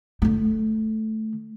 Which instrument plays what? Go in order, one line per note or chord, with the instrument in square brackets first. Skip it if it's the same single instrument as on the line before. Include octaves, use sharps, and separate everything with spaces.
[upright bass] D3 A3